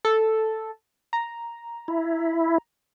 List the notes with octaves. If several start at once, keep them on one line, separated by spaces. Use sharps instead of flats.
A4
A#5
E4